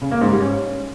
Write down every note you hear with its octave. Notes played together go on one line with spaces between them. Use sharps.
C#3
A#3
G#2
G3
C#4